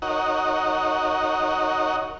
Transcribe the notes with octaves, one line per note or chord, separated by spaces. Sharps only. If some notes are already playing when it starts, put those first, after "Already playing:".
D#4 F#4 A#4 C#5 D#5 F#5